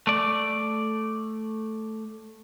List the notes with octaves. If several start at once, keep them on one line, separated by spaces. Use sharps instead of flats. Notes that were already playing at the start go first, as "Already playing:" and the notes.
A3 D5